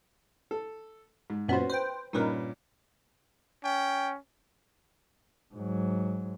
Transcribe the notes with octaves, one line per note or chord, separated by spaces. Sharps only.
A4
G#2
F#2 A#2 B3 C#4 F#4 C5
B4 C5 G5
G2 A#2 C#4 D#4 A#4 B4
C#4 G5
G#2 F#3